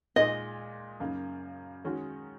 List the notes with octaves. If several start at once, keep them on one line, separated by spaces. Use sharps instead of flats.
A#2 G#3 D#4 D#5
F#2 C#3 A#3 D#4
D#3 G#3 C#4 F#4